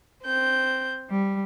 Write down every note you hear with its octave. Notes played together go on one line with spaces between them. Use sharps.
C4 G6
G3